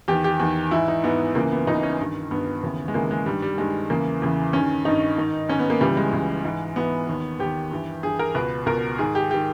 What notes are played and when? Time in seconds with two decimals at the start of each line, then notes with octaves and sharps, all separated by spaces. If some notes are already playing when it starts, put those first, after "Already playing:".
0.08 E2 D#3 G4
0.24 G4
0.40 E2 D#3
0.71 G#2 E3 E4
0.88 D#4
1.03 G#2 E3 B3
1.35 C#2 C#3 E3 A#3
1.51 B3
1.67 C#2 C#3 E3 D#4
1.83 C#4
1.99 G2 D#3
2.31 G2 D#3 B3
2.63 D#2 C#3 E3
2.88 G#3
2.94 D#2 C#3 E3 A#3
3.11 G#3
3.26 G2 D#3 G3
3.42 G3
3.58 G2 D#3 G#3
3.90 E2 C#3 E3 A#3
4.22 E2 C#3 E3
4.53 G2 D#3 C#4
4.85 G2 D#3 D#4
5.17 G#2 D#3
5.49 G#2 D#3 C#4
5.59 B3
5.70 A#3
5.80 C#2 C#3 E3 G3
5.97 G#3
6.13 C#2 C#3 E3
6.44 G#2 E3
6.76 G#2 E3 B3
7.08 D#2 D#3
7.39 D#2 D#3 G4
7.71 G2 E3
8.03 G2 E3 G#4
8.19 A#4
8.35 C#2 B2 B4
8.66 C#2 B2 A#4
8.98 G#2 D#3 G#4
9.15 G4
9.31 D#3 G4